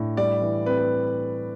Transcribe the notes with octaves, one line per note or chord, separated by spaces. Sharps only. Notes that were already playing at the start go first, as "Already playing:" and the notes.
Already playing: A2 D4
G3 D5
E3
C4 B4
B4